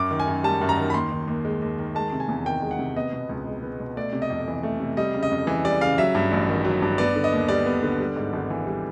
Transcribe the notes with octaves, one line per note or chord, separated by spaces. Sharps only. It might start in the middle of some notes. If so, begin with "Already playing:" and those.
Already playing: F#2 D6
D#3
G#5
F#2
G3 A5
F#2
A#5
D#3
B5
D#2 C6
D#3
D#2
G#3
D#2
D#3
G#3 A5
C3
G#5
E2
D#3 G5
G#3
F#5
C3
B3 D#5
B2
C#2
G#3
B3
B2
A3 D5
C3
D#5
F2
E3
A3
C3
G3 D#5
C#3
D#5
F2
E3
G3 D5
C#3 F5
F#3 E5
G2
A1
D#3
F#3
G2
B3 D5
D3
D#5
D#2
G3 D5
B3
D3
G3
G#2
G#1
E3
G3